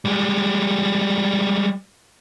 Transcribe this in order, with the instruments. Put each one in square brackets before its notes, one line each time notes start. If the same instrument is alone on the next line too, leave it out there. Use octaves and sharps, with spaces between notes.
[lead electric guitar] G3 G#3